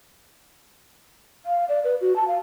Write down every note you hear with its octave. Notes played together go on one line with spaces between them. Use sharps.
F5
D5
B4
F#4
A5
F5